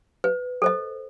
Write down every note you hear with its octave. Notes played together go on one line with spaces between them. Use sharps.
B4
A4 C5 D#5